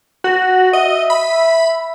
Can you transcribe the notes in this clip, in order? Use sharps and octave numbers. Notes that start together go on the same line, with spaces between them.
F#4
D#5 E5
B5